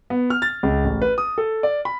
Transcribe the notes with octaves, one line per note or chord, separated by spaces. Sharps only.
B3
F6
A6
C#2
A1
B4
D#6
A4
D5
B5